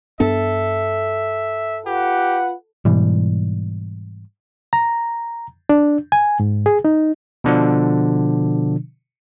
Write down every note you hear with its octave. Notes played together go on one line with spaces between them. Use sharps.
G2 B3 D4 A4 E5
F4 G4 B4 F#5
G#2 B2 E3 G3
A#5
D4
G#5
G#2
G#4
D#4
B2 D3 F3 D4